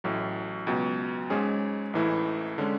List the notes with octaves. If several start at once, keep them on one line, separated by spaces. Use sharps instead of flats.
A1 A2 F#3
C#2 B2 F#3
G#2 G#3 C#4 G#4
A1 G#2 E3 A3 E4
D3 G#3 C#4